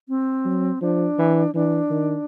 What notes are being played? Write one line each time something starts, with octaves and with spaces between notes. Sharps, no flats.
C4
F#3
F3 D4
E3
E3 D4
D#3